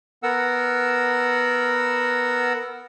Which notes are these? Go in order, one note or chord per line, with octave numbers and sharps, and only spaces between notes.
B3 A#4 F#5 E6